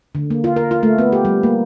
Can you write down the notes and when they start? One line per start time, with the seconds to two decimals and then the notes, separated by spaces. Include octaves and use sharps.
0.15 D3
0.30 A#3
0.44 F4
0.56 A#4
0.71 F4
0.83 A3
0.98 B3
1.12 G4
1.25 G3
1.43 A#3